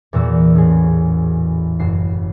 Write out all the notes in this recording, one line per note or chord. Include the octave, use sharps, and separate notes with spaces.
E2 A#2 F#4 E6
A1 G#4
F#1 F#4 C7